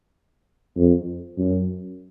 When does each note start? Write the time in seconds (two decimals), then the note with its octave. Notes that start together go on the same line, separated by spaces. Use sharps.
0.76 F2
1.38 F#2